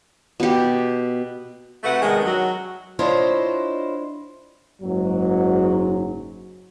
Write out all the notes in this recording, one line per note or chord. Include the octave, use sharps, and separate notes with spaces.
B2 G4
C3 A3 F#4 B4 F#5
D#3 G#3 B3 D4 D#4 A#4
F#3 F#4
D4 E4 F4 C5 C#5 D#5
F#1 G#2 F#3